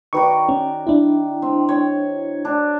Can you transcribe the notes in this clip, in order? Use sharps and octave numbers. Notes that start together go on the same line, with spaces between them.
D#3 F#4 B4 D5 C#6
C#4
D4 E4
C4
C#5
D4